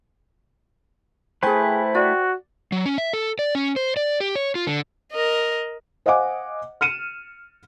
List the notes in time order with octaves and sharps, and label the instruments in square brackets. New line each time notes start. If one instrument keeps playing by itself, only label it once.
[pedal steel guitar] A3 E4 B4 [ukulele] G#4 G#5 [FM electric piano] C5 G5
[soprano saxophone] F#4 [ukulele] D5
[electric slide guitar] F#3
C#4
E5
A4
D5
C#4
C5
D5
G4
C#5
F4
D3
[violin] A#4 D#5
[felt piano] C5 D#5 F5 F#5 G#5 D6
F6 C#7 D#7 E7